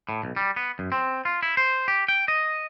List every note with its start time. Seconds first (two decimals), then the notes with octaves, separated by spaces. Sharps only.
0.09 A2
0.23 B1
0.36 G3
0.56 B3
0.79 F#2
0.92 C4
1.25 F4
1.43 E4
1.57 C5
1.88 G4
2.08 G5
2.28 D#5